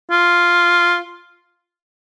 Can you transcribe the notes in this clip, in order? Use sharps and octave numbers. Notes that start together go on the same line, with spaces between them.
F4